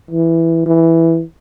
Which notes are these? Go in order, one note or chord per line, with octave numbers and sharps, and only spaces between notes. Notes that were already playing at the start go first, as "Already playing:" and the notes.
E3
E3